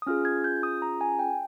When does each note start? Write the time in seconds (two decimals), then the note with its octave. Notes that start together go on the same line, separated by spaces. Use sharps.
0.02 D#6
0.07 C#4 F4 G#4 F6
0.25 G#6
0.44 G6
0.63 D#6
0.82 A#5
1.01 G#5
1.19 G5